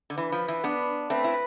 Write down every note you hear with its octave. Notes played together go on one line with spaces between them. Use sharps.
D3
E3 B4
F3
E3
B3 D4
A3 C4 B4
E4